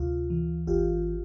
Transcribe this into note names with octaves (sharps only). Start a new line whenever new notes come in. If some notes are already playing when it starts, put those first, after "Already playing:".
Already playing: D2 C3 F4
E3
G#1 F4 G4